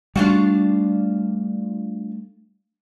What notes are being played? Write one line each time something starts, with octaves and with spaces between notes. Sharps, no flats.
G3 A3 D4 F4 F#4